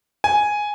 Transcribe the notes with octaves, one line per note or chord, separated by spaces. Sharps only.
G#5